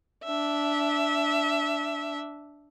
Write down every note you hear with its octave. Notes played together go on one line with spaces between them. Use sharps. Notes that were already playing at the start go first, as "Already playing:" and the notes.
D4 E5